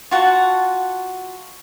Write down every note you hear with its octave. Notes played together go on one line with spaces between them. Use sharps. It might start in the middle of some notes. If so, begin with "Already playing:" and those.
F4 F#4 F#5 A5